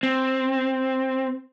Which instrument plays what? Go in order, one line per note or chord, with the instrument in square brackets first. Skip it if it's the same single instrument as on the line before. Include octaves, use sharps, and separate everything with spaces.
[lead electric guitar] C4